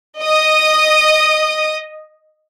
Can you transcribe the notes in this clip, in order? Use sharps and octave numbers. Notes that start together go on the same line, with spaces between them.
D#5 D#6